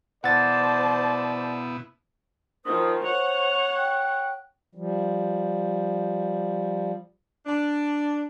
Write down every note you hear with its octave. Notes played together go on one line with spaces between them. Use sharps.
B2 B3 E4 C5 D5 F#5 A5 A6
D#3 F3 C5 D#6
C#5 F#5 F7
G5 F#6
F3 G3
D4